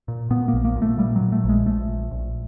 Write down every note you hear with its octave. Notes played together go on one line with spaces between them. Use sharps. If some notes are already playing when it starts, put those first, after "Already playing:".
A#2
A#2 B3
A#3
A#1
A#3
A#2
A3
A#2 G3
F#3
A#2
A3
A#1
G#3
A#1 A3
A#1
A#1